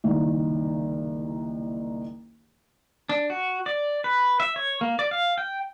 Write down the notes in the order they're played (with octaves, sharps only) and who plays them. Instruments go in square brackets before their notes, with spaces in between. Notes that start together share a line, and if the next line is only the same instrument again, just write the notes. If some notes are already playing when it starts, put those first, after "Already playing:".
[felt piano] F#1 C2 D#3
[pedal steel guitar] D4
F#4
D5
B4
E5
C#5
A#3
D5
F5
G5